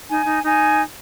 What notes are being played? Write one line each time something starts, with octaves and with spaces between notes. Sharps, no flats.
D#4 G#5
D#4
D#4 G#5